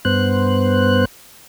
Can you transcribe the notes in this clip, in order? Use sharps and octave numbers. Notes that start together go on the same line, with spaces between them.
G2 B3 C5 F#6